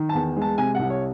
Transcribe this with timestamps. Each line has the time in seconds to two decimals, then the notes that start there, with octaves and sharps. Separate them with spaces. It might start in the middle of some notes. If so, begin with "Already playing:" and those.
Already playing: D#3
0.09 A5
0.15 E2
0.36 G#3
0.42 A5
0.58 C3 G#5
0.75 C2 F#5
0.90 C#5